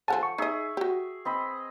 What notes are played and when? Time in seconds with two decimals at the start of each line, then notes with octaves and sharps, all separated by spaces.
0.08 F3 A4 F#5 G#5 A5
0.23 C#6
0.38 D#4 G#4 D#5 E5
0.77 F#4 G4
1.25 C4 D#5 B5